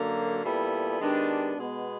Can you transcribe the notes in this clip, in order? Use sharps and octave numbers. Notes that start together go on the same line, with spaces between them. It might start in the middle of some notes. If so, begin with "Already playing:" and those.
Already playing: F#2 D3 F#3 A#3
A#2 G3 B3 E4 A4
D#3 G#3 B3 D4 G4
B2 G#3 B3